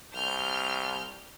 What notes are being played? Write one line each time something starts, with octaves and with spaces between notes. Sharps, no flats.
C2 F6 G6